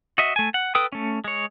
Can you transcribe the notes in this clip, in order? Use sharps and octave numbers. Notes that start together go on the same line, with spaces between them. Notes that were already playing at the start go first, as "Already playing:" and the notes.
F#4 D#5 E5
A3 G#5
F#5
A4 B4 G5 D#6
A3 C#4
G#3 C#5